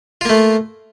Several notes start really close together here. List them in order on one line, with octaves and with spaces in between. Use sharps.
F4 A#3 A3